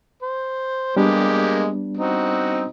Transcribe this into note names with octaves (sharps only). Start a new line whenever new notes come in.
C5
G3 G#3 A#3 B3 D4 G4
C4 D#4 F#4